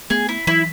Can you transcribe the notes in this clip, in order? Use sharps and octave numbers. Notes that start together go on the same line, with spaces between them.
A3 B3 G#4
E4
E3 F#3 E4